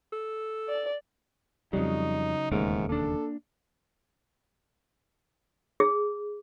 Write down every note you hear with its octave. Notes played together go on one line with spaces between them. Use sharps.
A4
D5
F2 C#3 F#3 G3 D#4
E1 D#2 G#2 C#3 G#3 A3 A#4
A#3 D4 A4
G#4